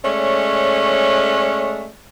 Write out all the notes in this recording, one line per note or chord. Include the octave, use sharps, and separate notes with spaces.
G#3 A3 C#4 C#5 D5